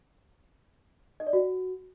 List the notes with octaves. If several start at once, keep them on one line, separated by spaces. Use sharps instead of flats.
D#5
D5
F#4